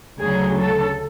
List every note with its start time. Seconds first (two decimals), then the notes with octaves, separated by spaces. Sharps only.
0.19 D2 C#3 F#3 G#4
0.58 A4